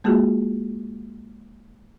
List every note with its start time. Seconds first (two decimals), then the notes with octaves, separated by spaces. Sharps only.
0.04 G#3 A#3 F4 F#4 G#4